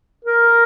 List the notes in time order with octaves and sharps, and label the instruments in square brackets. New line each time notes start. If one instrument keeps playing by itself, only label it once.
[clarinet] A#4